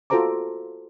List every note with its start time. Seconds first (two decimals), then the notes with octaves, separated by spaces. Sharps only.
0.10 F4 F#4 A4 C5 A#5 D6